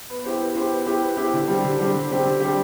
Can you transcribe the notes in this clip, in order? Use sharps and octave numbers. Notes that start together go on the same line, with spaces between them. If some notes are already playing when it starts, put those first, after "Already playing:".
B3
E4 G4 C5
B3
E4 G4 C5
B3
E4 G4 C5
B3
E4 G4 C5
D3
G3 C4 G4
D3
G3 C4 G4
D3
G3 C4 G4
D3
G3 C4 G4